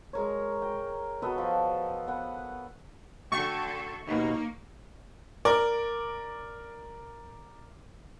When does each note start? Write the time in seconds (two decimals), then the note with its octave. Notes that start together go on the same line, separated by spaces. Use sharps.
0.13 G#3 A#4 C#5
0.62 G5
1.22 B3 F#4 A4 D#5
1.38 F3
2.08 B3 F#5
3.32 D3 A3 F#4 A4 G5 C#6
4.08 D#2 B2 A#3 D#4
5.45 A#4 D5 D6